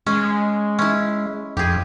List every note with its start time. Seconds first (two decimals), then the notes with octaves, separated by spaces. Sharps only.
0.07 G#3 C#4
0.79 C#4 E4
1.57 F2 G4 G#4